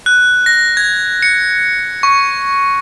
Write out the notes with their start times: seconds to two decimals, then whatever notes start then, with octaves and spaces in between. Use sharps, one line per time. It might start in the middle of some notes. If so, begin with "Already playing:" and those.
0.06 F#6
0.46 A#6
0.77 G#6
1.22 C#7
2.03 C#6